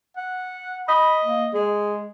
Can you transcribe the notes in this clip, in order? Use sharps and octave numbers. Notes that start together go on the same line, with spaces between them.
F#5
D#5 B5
A#3
G#3 G#4